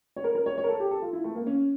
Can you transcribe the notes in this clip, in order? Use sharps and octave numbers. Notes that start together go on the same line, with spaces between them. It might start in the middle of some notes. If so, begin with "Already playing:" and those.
C#5
A#4
A#4
C#5
C#5
A#4
A4
G4
A4
F4
E4
A3
A#3
C#4